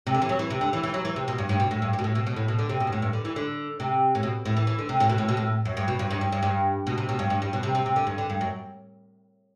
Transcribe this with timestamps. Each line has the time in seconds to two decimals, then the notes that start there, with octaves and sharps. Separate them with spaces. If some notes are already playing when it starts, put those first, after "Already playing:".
0.07 C3
0.14 D3
0.22 E3
0.29 F#3
0.39 E3
0.50 C3
0.61 D3
0.73 E3
0.83 E3
0.94 F#3
1.05 E3
1.16 C3
1.28 B2
1.38 G2
1.49 G2
1.60 B2
1.71 A2
1.82 G2
1.93 A2
1.99 B2
2.04 A2
2.15 B2
2.27 B2
2.36 A2
2.48 B2
2.59 D3
2.69 C3
2.80 B2
2.87 G2
2.92 A2
3.02 G2
3.13 D3
3.25 E3
3.36 D3
3.80 C3
4.15 A2
4.23 B2
4.45 A2
4.57 E3
4.67 E3
4.79 D3
4.89 C3
5.00 A2
5.09 B2
5.18 A2
5.29 B2
5.37 A2
5.65 F#2
5.77 G2
5.88 B2
5.99 G2
6.10 G2
6.21 G2
6.32 G2
6.43 G2
6.87 B2
6.98 C3
7.09 B2
7.19 G2
7.30 G2
7.42 G2
7.53 B2
7.63 C3
7.75 C3
7.86 C3
7.96 D3
8.07 G2
8.18 D3
8.30 G2
8.41 F#2